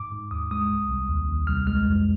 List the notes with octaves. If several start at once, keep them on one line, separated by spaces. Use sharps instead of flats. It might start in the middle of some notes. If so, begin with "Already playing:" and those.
Already playing: G#2 D6
G#2
D#2 D#6
G#3 D#6
C2
C2
D#2
D#2
C2 F6
G#3 F6
F2